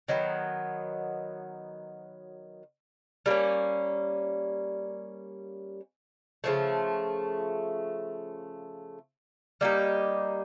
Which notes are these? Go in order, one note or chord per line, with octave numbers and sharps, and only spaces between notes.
D#3 F#3 B3
G3 A#3 C#4
C#3 F3 A3
G3 A#3 D#4 G4